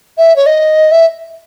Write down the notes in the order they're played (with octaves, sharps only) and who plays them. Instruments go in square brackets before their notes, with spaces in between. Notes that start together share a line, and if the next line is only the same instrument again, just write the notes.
[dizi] E5
C#5
D#5
E5